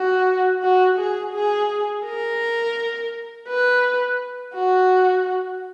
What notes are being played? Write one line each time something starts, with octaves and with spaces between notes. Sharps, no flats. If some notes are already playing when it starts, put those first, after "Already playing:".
Already playing: F#4
F#4
G#4
G#4
A#4
B4
F#4